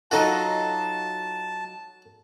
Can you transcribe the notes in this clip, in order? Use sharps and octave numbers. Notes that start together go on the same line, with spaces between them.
F#3 D#4 F4 F#4 A4 D#5 A5